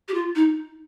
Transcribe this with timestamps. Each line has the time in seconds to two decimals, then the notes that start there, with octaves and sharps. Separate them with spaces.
0.09 G4
0.14 F4
0.36 D#4